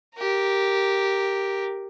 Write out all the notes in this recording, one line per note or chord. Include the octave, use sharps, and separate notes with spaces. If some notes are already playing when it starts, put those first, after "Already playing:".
G4 A#4